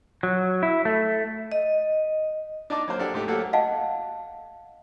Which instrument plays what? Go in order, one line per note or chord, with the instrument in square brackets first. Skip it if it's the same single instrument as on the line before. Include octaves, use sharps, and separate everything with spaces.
[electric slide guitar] F#3
E4
A3
[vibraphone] D#5
[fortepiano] D4 D#4 A5 D6
F#3 A#3 C5
D4 F#4 G4 A4
G#2 A3 G4
F#3 A3 A#3 F#4 G4 A4
[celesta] D#5 F5 F#5 A5